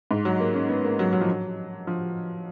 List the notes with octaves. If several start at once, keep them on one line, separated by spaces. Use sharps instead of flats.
G#2
F#3
A#3
C#4
B3
A#3
F#3
F#3
F3
F#3
F3